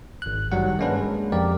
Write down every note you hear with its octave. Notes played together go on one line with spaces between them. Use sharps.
G#1 F#6
G2 D#3 F#3 G3 F#5
G#3 A#3 C#4 D4 B4
G#3
F2 G4 A#4 D5